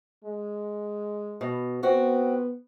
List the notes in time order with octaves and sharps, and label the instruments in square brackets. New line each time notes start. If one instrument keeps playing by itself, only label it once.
[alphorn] G#3
[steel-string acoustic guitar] B2
[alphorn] B3 [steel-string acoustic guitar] C4 F#4